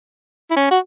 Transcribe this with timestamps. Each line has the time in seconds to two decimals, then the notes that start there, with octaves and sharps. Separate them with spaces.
0.51 E4
0.56 C#4
0.71 F#4